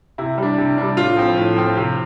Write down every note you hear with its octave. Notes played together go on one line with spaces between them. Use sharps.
C3 E4
G3 D4
C3
G3 D4
A2 F4
F3 C4
A2
F3 C4
C3